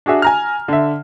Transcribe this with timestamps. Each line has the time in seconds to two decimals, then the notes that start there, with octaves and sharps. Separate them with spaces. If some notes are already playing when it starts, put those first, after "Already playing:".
0.06 D4 F#4 G#4 E5
0.22 G#5 A#5 F6
0.68 D3 E5